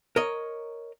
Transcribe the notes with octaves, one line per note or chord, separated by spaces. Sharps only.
A#4 C#5 D#5